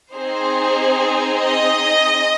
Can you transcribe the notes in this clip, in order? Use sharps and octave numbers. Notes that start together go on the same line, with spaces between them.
C4 D#4 G#4 C5
D#5